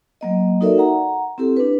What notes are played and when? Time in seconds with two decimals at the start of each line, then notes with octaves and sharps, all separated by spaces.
0.21 F#3 A#3 D#5
0.61 D#4 F#4 A4 A#4 D5 E5
0.78 F#5 A#5
1.38 C4 E4 G4 A4
1.57 D4 B4